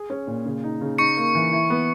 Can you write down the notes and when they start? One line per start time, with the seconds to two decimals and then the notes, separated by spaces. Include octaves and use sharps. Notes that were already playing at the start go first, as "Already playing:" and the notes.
Already playing: G#4
0.10 C#4
0.27 A#2
0.45 C#3
0.63 D#4
0.81 C#3
0.98 D#4 C#6 C#7
1.17 A#3
1.35 E3
1.52 E4
1.70 B3